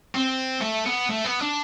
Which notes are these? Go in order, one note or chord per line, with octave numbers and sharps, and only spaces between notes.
C4
A3
B3
A3
B3
D4